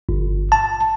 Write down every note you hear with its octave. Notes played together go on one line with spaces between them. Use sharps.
G1
A5